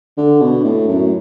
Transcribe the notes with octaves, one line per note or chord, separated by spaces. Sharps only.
D3
B2
A2
F#2